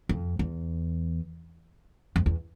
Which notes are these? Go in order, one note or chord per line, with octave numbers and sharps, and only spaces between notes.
F2
E2
F2
E2